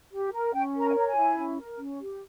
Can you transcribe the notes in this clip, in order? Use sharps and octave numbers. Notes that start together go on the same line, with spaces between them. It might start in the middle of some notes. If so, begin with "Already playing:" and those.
G4
A#4
C#4 G5
A#4
A#5
G#5
C#5 A#5
G#5
E4
C#4
A#4
C#4
G4